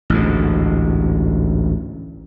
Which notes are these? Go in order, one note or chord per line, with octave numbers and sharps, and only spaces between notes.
A1 D2 G#2